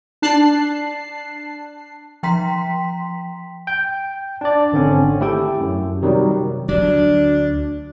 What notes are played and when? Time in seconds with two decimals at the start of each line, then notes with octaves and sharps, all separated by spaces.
0.22 D4 A5 F#6 C7
2.23 F3 G5 A#5 C6 B6
3.67 G5 G6
4.41 D4 D5
4.72 G#1 D3 C4 C#4
5.21 A3 E4 G4 A4 G5
5.60 F#2
6.02 C3 D#3 F#3 G3
6.69 D2 F#3 D4